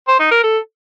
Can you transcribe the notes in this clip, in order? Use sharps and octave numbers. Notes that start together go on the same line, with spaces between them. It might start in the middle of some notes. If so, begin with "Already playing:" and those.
C5
D#4
A#4
A4